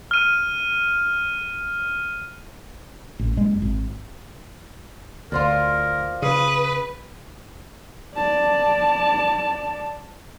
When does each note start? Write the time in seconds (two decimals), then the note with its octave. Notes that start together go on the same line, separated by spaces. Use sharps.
0.11 F6 D#7
3.19 A1
3.37 F#1 G#3
3.62 G#1
5.32 D2 F4 A#4 C5 D5
6.22 C#3 B4 D#6
8.16 D5 A5